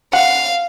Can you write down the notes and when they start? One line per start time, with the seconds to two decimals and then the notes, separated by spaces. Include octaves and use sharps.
0.13 F5 F#5